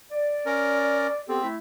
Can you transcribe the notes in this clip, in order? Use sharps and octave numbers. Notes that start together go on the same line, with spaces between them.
D5
C#4 A#4
B3 C4 G4 A4
A3 E4 E5